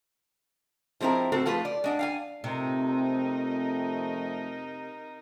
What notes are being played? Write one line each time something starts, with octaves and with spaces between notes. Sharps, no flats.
F3 G#3 C4 E4 A#4
A2 C4 F#4 A4
F3 A3 F4 G#4 B4
D5
G#3 D4 F#5
F5 G5 G#5
F2 C3 A3 D#4 A#4